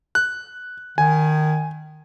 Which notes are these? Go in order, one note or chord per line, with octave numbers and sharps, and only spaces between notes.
F#6
D#3 G#5